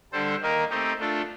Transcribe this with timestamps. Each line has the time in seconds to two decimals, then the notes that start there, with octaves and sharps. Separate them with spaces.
0.12 D3 G3 D4 A4 C5
0.42 D#3 A#3 D#4 A#4
0.70 A3 C4 D#4 G4
0.98 A3 D4 F4 A4